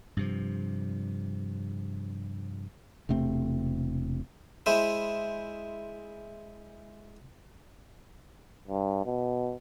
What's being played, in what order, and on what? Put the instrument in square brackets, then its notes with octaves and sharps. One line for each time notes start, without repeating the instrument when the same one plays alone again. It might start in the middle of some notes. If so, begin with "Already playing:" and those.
[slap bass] G2 C3 F3
[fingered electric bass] E1 C3 A3 C4
[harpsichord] G#3 E4 C5
[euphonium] G2
B2